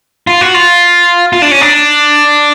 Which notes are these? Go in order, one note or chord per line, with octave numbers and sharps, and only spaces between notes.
F4
F#4
F4
F4
D4
C#4
D4